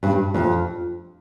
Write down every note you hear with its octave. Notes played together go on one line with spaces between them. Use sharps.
G2
F2